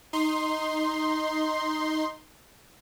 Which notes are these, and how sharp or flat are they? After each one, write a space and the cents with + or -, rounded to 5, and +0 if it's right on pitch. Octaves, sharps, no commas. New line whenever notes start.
D#4 +0 C6 +5